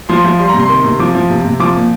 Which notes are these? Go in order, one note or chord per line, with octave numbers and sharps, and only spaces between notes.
F3 C6
F3
G3 C6
A#5
C3
C6
D#3
C3
F3 D6
F3
C3
C3
F3 D6
A#2